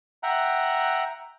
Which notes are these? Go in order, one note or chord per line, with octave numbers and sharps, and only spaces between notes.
E5 F#5 G5 A#5 F#6